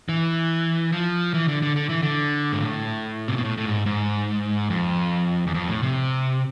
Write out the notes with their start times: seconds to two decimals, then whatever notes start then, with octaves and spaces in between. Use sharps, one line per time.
0.09 E3
0.92 F3
1.34 E3
1.48 D3
1.62 D3
1.76 D3
1.89 E3
2.03 D3
2.52 G#2
2.61 A2
3.28 C3
3.37 B2
3.45 A2
3.58 A2
3.66 G#2
3.86 G#2
4.70 F2
5.47 E2
5.54 F2
5.68 A2
5.83 C3